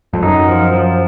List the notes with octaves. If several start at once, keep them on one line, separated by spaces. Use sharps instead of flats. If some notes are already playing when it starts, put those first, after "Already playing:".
F2
F#2 D#4
F3
F3